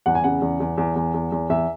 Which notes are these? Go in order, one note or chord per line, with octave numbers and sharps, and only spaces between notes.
E2 F#5
G#5
C#3 F#5
E2
E2
E2
E2
E2
E2
E2 E5